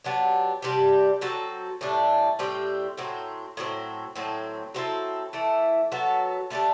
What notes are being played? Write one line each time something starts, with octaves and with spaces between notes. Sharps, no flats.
F#3 B3 D4 G4
C3 G3 D4 G4
F#3 C4 F#4 A4
A2 E3 G3 D4
A2 G3 C4 G4
A2 F#3 C4
A2 F#3 A3 C4
A2 F#3 C4
F#3 C4 E4 A4
E3 A3 E4
F#3 B3 F#4 A4
D3 A3 D4 G4